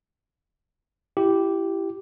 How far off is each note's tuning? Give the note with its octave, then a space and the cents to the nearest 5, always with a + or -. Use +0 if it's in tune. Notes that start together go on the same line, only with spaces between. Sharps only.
E4 +25 G4 -5